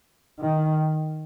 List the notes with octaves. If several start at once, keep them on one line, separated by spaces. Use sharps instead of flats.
D#3